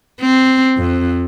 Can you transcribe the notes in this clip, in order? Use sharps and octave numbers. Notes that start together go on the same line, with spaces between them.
C4
F2